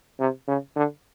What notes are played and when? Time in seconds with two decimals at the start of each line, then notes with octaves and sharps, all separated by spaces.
0.20 C3
0.48 C#3
0.76 D3